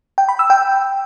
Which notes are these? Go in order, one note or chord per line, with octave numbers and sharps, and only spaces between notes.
G5
B5
E6
G5